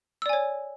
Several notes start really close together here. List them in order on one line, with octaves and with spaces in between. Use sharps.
E6 D5 G#5 C#5